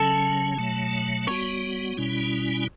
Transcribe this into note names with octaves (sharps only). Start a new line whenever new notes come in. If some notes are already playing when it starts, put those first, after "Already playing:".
Already playing: C#3 F#3 C#4 A4
B2 F#3 A3
G3 B3 F#4 C#5
B2 G3 C#4 E4